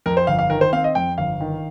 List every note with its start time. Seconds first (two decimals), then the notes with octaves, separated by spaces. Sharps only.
0.06 F2 A#4
0.17 C5
0.27 G1 F5
0.39 F5
0.50 D#3 A#4
0.61 C5
0.73 C4 F5
0.84 D#5
0.95 F2 G5
1.18 G1 F5
1.40 D#3